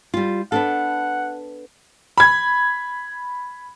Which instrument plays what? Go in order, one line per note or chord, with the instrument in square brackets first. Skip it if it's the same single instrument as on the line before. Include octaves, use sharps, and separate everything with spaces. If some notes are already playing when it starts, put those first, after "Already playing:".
[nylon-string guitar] G3 F4
[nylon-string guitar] B3 D4 A4 [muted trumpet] F#5
[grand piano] B5 G#6